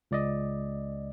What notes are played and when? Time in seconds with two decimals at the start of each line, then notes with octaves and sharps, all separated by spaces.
0.11 C#2 D5 D#5